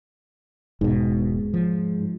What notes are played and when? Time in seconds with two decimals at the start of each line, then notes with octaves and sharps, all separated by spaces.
0.81 E1 G#2 B2
1.54 F3